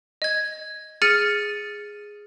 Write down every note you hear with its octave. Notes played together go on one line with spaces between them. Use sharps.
D#5 G#6
G#4 F6 A6 C#7 D#7